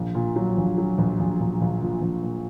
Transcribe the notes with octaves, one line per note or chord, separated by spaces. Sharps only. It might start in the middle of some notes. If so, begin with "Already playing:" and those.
Already playing: A#1
A#2
F#3
A#1
F#3
A#1
A#1
A#1
A#1
A#2
A#1
A#2